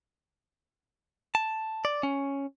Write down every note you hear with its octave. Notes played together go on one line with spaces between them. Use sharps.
A5
D5
C#4